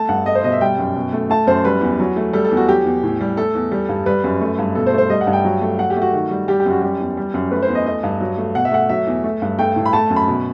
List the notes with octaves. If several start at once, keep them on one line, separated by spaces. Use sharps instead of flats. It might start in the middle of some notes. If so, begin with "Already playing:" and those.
Already playing: A3 A5
G2 F#5
A3 D#5
C5
B2 D#5
E5
G3 G5
F#2
B2
A3
A3 A5
F#2 C5
G3 B4
E2
F#3
A3
G3 A4
A4
E2
F#4
F#3 G4
E2
A2
G3
A3 A4
E2
G3
G2
G3 B4
F#2
A3
G2
B2 A4
C5
A3
C5
G3 D#5
F#5
G2
G5
F#3
A3
F#3 F#5
G4
A3
F#4
D#3
G3
G3 G4
G4
F#2
F#4
G3 G4
E2
G3
F#2
A3 B4
C5
E2
D#5
A3 D#5
G2
F#3
A3
B2 F#5
E5
A3 F#5
F#3 E5
E2
A3
G2
A3 G5
A2
B5
A3 A5
F#2
B5
B2